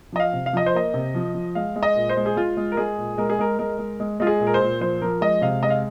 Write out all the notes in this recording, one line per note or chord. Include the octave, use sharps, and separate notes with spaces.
F3 D#5
F5
C3
F5
F3 D#5
C5
A#3 D#5
C3
F3
F3
G#3 F5
G#3
D#5
A#2
C5
G#3
G#4
G#3 F4
G#3
A#4
G#3 G#4
A#2
G#3 A#4
G#4
G#3 A#4
G#3 A#4
G#3
G#3
G#3 F4
G#4
A#2
A#4
C5
A#2
F3 C5
F3 A#4
G#3 D#5
C3 F5
G#3 D#5
F5